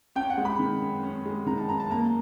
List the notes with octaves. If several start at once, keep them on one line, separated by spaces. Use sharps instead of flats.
C#4 G5
F#5
G#3
B5
D#3
F#2
C#4
G#3
D#3 A#5
A5
F#2 A#5
A5
A#3 A#5